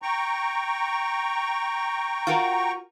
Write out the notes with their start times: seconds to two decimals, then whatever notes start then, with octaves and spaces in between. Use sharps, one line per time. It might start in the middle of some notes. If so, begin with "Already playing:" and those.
0.02 G5 A#5 C#6
2.27 F4 F#4 A#4